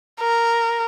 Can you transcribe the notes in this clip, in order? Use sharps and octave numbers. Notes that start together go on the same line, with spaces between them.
A#4